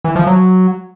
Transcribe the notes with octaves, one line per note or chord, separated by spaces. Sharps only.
E3
F3
F#3